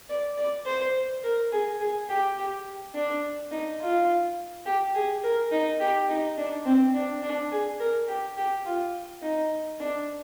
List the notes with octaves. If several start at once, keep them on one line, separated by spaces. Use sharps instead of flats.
D5
D5
C5
A#4
G#4
G#4
G4
G4
D4
D#4
F4
G4
G#4
A#4
D#4
G4
D#4
D4
C4
D4
D4
G#4
A#4
G4
G4
F4
D#4
D4